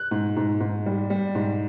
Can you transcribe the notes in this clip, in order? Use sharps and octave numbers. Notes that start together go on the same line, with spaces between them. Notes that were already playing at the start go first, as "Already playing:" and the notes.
Already playing: F#6
G#2
G#2
G#2
G3
G3
G#2